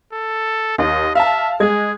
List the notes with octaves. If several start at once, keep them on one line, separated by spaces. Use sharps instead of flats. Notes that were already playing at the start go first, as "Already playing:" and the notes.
A4
D#2 D#5
E5 F5 A5
G#3 G#4 G#6